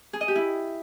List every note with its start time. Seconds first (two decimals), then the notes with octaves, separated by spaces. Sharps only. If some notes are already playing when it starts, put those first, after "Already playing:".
0.13 G#4
0.21 D#5
0.28 G4
0.35 E4